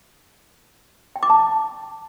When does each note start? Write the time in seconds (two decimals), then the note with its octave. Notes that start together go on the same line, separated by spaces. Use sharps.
1.16 G5
1.23 D6
1.30 A5